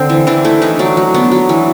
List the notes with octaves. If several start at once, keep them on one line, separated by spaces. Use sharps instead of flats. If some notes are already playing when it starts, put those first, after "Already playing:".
Already playing: D3 C4
E3
E3 D4
A3 E4
E3 D#4
F#3 D4
F#3
B3 D4
F#3
E3